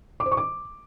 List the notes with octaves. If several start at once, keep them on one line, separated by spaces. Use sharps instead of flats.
D6
C5
C#6
D6